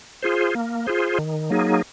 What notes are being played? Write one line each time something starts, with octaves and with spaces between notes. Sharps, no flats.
F4 G#4 C5
A#3
F4 G#4 C5
D#3
F#3 A#3 D#4 G#4